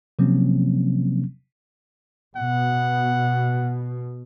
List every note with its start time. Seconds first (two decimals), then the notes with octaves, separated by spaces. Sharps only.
0.19 C3 F3 F#3 A#3 C4 C#4
2.36 B2 F#5